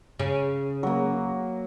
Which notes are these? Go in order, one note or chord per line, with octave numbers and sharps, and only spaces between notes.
C#3
F#3 A#3